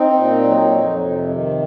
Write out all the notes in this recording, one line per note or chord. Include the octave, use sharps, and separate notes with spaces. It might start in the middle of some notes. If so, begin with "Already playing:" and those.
Already playing: C4 D#4
A#2
F#3
F2
C3
D#3